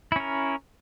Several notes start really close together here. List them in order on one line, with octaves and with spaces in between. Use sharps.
E4 C#4 A#4